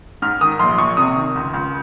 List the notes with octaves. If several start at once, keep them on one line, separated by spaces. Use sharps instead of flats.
G#2 F6
D#3 D#6
A#1 C6
A#1 C#6
C3 D#6
D#3
C#2
C#2